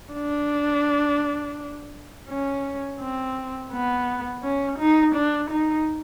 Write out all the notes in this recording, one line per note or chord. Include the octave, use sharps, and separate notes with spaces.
D4
C#4
C4
B3
C#4
D#4
D4
D#4